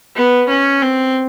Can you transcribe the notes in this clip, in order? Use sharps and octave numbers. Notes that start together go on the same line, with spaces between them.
B3
C#4
C4